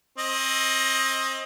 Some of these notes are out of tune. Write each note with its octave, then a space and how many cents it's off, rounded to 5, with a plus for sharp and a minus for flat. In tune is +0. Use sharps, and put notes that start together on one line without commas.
C4 +30 D#5 +15